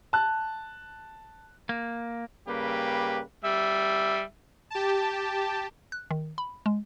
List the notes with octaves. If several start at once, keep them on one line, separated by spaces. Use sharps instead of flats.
A5 F#6
A#3
C#3 G3 A#3 G4 B4
G3 E5
G4 A5
F#6
D#3
B5
G#3